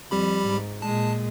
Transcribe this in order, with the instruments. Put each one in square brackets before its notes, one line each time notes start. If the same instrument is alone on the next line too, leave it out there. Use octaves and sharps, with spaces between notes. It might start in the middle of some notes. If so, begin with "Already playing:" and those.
[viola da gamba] F2 [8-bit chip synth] G3 G4 B5
[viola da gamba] G#2
[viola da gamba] A#2 G#3 [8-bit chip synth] A5